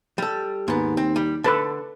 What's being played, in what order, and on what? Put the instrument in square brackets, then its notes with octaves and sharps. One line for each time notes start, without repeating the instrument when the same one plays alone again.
[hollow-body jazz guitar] G3 A4
[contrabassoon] D#2 [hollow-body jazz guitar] G#2 B3
[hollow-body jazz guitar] C4
G3
[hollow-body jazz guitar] D3 [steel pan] A4 B4 A5